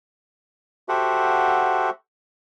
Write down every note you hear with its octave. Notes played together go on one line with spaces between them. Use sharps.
F#4 G4 A4 C5 E5 F#5